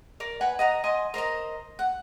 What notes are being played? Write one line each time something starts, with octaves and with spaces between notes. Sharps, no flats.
A#4 D5
B4 F#5 G#5
D#5 F#5 A#5
D#5 G#5 C6
A#4 C5 D#5 A#5
F#5